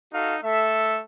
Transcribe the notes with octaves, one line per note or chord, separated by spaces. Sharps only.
D#4 F#4 A4 F5
A3 A4 E5